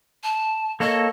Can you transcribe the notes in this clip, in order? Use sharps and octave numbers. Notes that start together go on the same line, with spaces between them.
A5
A#3 A4 C#5 D#5